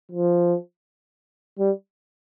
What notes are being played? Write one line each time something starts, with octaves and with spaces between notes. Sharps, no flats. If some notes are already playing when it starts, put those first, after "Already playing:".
F3
G3